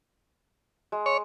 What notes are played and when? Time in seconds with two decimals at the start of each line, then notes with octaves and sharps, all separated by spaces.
0.92 G#3
1.06 C#5